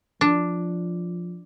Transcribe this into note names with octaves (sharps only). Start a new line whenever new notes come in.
F3 D4